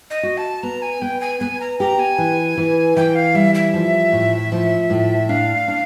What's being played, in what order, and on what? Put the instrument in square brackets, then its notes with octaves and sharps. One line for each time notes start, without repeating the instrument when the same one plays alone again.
[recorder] D#5
[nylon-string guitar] F#4
[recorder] A5
[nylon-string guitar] B3 [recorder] A#5
[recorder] G#5
[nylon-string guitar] B3 [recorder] G5
[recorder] G#5
[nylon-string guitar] B3 [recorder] G#5
[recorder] A#5
[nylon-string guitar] G4 [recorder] A#5
[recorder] G#5
[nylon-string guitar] E3
E3
[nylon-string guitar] E3 [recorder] G5
[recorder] F5
[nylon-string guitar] G3 [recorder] E5
[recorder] E5
[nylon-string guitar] F3
A2
F3
A2
[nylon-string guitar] D4 [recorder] F5
[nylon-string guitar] D4